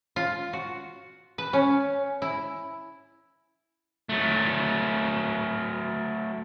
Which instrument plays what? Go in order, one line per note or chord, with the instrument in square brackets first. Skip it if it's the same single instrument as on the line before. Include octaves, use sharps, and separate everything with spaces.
[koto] F4
F#4
B4
C#4
E4
[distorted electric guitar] F#3 A3